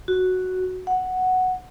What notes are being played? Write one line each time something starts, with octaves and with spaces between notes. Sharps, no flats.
F#4
F#5